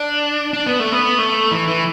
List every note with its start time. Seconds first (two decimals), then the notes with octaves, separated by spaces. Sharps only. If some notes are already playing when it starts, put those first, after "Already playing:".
Already playing: D4
0.53 D4
0.66 B3
0.80 A3
0.92 B3
1.18 A3
1.51 E3
1.68 E3